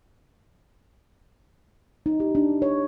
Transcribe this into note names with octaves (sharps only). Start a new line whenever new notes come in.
D#4
G4
D4
C#5